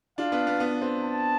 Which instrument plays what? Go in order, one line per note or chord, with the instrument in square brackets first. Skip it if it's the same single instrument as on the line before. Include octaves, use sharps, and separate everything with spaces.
[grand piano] D4 F4 [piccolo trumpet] F5
[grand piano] B3 D4
B3
B3
C4
[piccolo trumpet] A5